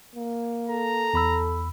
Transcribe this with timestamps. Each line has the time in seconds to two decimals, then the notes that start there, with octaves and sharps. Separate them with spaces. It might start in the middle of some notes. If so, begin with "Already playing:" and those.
0.16 A#3
0.69 A4 A#5
1.14 E2 B5 E6